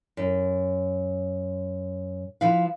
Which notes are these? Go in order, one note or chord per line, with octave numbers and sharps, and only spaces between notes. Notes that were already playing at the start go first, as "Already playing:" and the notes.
F#2
F3 E4 B4 F5